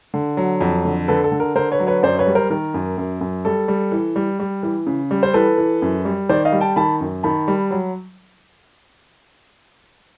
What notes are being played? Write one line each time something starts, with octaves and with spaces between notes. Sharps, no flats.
D3
F#3
F2
D3
D3 A4 B4
A4
D3
A#4
D3 A#4 C5
B4 C#5
F#3
B4 C#5
F#2 C5 D5
B4 C#5
G3
A#4 C5
D#3 A#4
F#2
F#2
F#2
G3 A4
G3
E3
G3
G3
E3
C#3
G3
C5
E3 A4 B4
E3
F#2
G3
D#3 C5 D5
D#5 F5
G3
G5 A5
D#3 A5 B5
F#2
D#3 A5 B5
G3
F#3